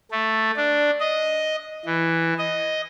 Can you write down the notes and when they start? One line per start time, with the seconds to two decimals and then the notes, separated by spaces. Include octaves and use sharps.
0.12 A3
0.56 D4
1.00 D#5
1.85 E3
2.39 D#5